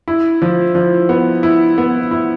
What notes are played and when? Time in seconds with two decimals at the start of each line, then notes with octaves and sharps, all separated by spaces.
0.08 E4
0.42 F3
0.75 F3
1.09 B3
1.43 E4
1.78 B3
2.11 E4